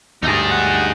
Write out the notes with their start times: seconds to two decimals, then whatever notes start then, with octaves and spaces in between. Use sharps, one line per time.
0.23 D2 G2 D#4 G#4
0.51 F#5